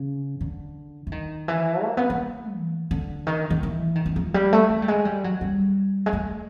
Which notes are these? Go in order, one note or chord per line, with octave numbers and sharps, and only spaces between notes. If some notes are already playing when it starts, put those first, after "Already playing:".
Already playing: C#3
D3
E3
D#3
E3
A#3
B3
A#3
E3
D3
D#3
D#3
E3
D#3
E3
F3
G3
A3
A3
G3
G#3
G3
F#3
G3
G#3
A3